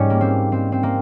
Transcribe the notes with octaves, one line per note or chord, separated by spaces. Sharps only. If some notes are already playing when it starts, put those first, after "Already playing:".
Already playing: G#2 G3 C#4
A#3
C4
C4
C4
A#3